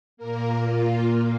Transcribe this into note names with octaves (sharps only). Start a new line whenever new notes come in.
A#2 A#3 A#4
F4